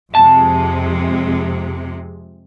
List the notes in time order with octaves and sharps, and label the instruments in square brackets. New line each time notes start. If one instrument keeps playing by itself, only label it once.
[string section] F2 C3 G#3 [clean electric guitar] A5